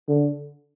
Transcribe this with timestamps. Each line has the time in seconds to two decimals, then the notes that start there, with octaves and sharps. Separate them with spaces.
0.08 D3